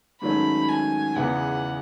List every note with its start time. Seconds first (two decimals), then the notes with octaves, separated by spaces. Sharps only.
0.22 G#2 D#3 F#3 A3 C#4 B5
0.69 G#5
1.16 E2 C#3 E3 B3 F#5